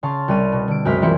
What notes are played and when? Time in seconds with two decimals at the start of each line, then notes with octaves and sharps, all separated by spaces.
0.03 C#3 F5 A5 C6 C#6
0.28 C2 G3 F6 D#7
0.52 B2
0.68 D3 D7
0.85 C2 F#2 G#3 C5 F6 B6
1.02 F2 E3 A#3 C4 E4 C#7